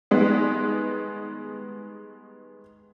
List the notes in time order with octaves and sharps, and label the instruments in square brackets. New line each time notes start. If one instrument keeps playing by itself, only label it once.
[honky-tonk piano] D#3 G3 G#3 B3